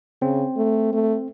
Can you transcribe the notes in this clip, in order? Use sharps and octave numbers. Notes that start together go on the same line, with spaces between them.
C#3 C4
A3
A3